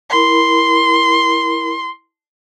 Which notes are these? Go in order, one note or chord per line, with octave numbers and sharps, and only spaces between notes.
E4 A#4 B5 C6